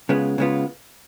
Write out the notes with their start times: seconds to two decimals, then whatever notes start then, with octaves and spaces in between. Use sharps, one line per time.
0.09 C#3 G#3 B3 F4
0.38 C#3 G#3 B3 F4